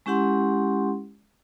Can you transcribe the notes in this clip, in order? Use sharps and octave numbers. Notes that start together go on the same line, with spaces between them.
G#3 C#4 E4 G4 F#5 C6